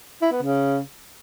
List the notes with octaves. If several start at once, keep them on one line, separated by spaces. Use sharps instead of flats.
E4
B3
C#3